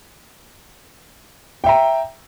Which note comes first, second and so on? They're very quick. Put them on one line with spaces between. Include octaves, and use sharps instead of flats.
G5 E5 A#5